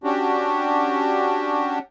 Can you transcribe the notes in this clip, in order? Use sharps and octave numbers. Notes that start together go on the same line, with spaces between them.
C#4 D4 F#4 G4